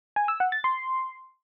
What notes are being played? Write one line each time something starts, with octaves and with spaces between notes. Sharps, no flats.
G#5
E6
F#5
A6
C6